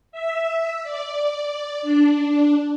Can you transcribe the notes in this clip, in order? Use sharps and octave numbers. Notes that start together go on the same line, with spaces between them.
E5
D5
D4